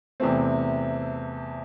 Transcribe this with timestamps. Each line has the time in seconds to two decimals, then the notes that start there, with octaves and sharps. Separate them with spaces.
0.20 E2 C3 E3 A3 C4